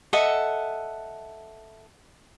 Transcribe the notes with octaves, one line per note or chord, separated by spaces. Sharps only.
A4 D#5 E5 F#5